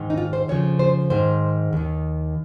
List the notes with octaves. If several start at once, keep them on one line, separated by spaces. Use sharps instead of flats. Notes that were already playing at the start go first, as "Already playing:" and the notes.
Already playing: G#2 D#3
D#4
F4
C5
F2 C#3 F3 C#5
C5
G#2 D#3 C5
D#2 D#3